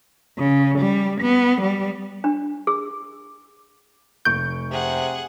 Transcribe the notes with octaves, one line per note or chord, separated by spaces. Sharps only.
C#3
G3
B3
G3
D4
G#4
F1 C#6 G6 D7
C3 G#4 F#5